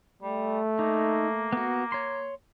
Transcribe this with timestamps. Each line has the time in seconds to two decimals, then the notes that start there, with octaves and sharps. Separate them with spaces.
0.22 G3 A3
0.79 A#3 D#4
1.53 B3 F#4
1.92 C#5 C6